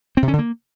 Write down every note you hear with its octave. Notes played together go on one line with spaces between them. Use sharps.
C4
C3
C#4
D3
A#3